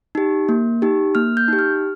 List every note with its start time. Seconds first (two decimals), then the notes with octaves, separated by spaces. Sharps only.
0.15 D#4 G4
0.49 A#3
0.82 D#4 G4
1.15 A#3 F6
1.37 G6
1.48 D#4 G4
1.59 F6